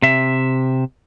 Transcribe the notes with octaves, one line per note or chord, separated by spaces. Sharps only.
C3 E5